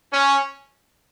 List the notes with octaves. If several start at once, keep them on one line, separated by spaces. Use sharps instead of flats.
C#4